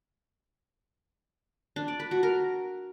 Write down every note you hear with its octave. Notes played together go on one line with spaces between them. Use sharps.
D4
D5
B4
F#4
A#4